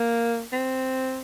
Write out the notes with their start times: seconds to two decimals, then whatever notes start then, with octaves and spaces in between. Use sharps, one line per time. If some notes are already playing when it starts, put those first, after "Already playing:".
Already playing: A#3
0.52 C4